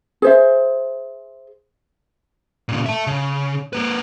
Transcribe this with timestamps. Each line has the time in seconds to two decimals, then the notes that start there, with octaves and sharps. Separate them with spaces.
0.22 G#4 C5 E5
2.69 A#2 C#3
2.86 E5 A5
3.07 C#3
3.73 A#3 B4